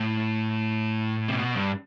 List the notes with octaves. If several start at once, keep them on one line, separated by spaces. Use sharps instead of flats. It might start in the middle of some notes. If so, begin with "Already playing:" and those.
Already playing: A2
C3
B2
G2